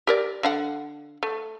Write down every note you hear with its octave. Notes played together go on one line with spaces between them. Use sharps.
G4 A#4 D5
D3 F5 F#5
A3